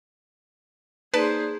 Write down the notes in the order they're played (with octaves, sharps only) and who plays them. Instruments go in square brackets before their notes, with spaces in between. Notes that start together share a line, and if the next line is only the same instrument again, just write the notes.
[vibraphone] A#3 D#4 D5 [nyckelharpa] G#4 C5 [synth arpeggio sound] B4 A5